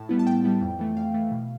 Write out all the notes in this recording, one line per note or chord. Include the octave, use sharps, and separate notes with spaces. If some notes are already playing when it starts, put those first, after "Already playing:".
Already playing: A2 A5
G3 B3 E4
A5
A2 G5
G3 B3 E4
F2
E3 A3
F2 F5
E3 A3
B2